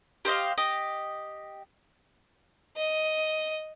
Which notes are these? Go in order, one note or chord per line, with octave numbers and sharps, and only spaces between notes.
G4 C5 D#5 F5
G4 D#5
D#5